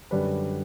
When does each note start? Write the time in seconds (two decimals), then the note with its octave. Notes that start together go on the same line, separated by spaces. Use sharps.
0.11 F#2 D3 G3 D4 B4